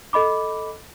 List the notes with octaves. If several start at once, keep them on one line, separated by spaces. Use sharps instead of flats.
A4 D#5 B5 D6